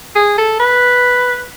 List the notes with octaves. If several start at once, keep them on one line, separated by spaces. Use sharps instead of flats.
G#4
A4
B4